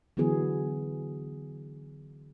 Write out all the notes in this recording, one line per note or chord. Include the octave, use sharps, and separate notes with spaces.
D3 E3 F#3 B3 G#4